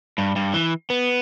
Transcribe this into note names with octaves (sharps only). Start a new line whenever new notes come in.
G2
G2
E3
B3